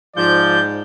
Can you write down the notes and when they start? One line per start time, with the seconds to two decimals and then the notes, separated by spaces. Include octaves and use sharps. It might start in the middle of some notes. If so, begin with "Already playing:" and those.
0.17 G#2 F3 D5 G6